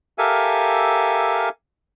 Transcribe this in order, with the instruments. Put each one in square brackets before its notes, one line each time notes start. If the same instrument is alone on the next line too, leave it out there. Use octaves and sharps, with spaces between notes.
[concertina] G4 A4 A#4 E5 F5 G#5